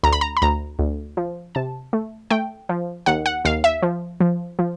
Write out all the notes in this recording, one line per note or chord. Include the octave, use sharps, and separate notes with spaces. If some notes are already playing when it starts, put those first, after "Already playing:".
D2 A#5
B5
A#5
B5
D2 A#5
D2
F3
C3 A5
A3
A3 G5
F3
D#2 F#5
F#5
D#2 F5
E5
F3
F3
F3